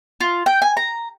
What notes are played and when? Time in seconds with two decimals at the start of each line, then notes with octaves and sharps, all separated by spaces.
0.20 F4
0.46 G5
0.62 G#5
0.77 A#5